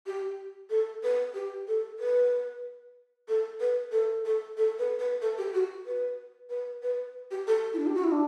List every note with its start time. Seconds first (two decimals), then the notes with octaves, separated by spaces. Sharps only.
0.06 G4
0.70 A4
1.03 B4
1.34 G4
1.68 A4
1.99 B4
3.28 A4
3.60 B4
3.92 A4
4.25 A4
4.57 A4
4.79 B4
4.99 B4
5.21 A4
5.38 G4
5.54 F#4
5.86 B4
6.50 B4
6.82 B4
7.31 G4
7.47 A4
7.74 E4
7.79 D4
7.87 G4
7.95 F#4
8.04 E4
8.12 D4